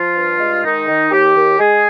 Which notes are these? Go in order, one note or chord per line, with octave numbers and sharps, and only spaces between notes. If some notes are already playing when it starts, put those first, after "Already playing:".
Already playing: F3 F4
G2
G#3
D#3 D#4
D#3
D#2 G4
D#2
G#3 G#4